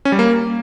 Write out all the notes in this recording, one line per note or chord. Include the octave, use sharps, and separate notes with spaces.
C#4
G3
A#3